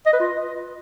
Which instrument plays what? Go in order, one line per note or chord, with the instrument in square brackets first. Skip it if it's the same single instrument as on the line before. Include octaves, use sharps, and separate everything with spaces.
[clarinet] D#5
B4
F4